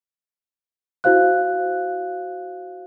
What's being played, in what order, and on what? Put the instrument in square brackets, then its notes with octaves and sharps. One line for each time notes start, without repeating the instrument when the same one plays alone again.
[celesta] E4 F#4 C5 F5 F#6